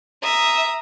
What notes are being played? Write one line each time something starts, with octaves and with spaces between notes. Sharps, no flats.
E5 A#5 D#6